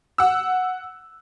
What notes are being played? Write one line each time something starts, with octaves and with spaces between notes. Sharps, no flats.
F#5 E6